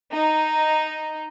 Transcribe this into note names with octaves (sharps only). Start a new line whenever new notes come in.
D#4